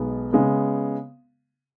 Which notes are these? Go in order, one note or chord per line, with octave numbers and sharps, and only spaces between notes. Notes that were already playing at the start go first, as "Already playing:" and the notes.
Already playing: B1 B2 G#3 B3
C#3 G#3 B3